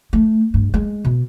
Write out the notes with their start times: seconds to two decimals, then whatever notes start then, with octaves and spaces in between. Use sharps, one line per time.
0.13 A3
0.54 G2
0.74 G#3
1.05 B2